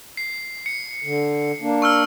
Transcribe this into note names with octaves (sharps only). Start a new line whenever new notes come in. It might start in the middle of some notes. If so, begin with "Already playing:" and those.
C7
C#7
D3
A#3 D4
C#6 E6 F6